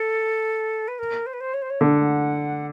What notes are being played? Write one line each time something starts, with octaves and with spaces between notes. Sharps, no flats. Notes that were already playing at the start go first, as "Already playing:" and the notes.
Already playing: A4
B4
A#4
C5
B4
C5
C#5
C5
C#5
D3 F#5